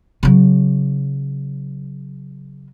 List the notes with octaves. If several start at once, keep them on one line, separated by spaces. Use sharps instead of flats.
C#3 F#3